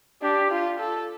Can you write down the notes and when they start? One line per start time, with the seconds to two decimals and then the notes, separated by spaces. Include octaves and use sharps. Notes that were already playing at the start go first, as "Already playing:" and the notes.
0.22 D4 G4
0.51 F4
0.79 A4